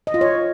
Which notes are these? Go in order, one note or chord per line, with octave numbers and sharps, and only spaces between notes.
D#5
F4
C#5